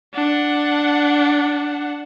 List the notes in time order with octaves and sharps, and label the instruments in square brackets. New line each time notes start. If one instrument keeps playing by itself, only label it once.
[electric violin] D4 F#5